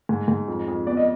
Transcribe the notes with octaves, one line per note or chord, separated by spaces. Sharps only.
G#2
G#2
F2
F2
B3 D5
D#5